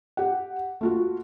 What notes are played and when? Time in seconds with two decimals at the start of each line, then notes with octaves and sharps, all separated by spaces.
0.17 G4 F#5
0.81 A3 F4 F#4